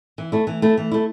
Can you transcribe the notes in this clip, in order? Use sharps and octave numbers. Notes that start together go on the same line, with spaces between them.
E3
A3 E4
E3
A3 E4
E3
A3 E4